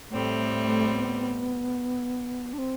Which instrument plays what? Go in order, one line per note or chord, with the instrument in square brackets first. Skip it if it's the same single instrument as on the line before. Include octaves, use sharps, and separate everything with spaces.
[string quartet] A2 G3 C4 [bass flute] A3
[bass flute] A3
B3
D4
C4